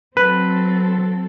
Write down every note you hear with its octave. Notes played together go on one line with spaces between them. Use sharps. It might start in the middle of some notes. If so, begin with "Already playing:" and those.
F#3 C4 A4 B4